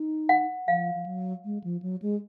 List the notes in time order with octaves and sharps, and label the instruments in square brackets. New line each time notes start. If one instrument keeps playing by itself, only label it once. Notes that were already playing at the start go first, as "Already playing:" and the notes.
Already playing: [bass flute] D#4
[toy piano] F#5
[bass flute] F3 [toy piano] F5
[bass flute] F3
F#3
G#3
F3
F#3
G#3